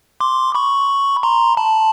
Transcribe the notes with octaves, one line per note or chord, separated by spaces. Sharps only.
C6 D6
B5 C#6
A#5 C6
A5 B5